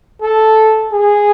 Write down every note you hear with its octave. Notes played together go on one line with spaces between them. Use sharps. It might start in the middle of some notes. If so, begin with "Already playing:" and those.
A4
G#4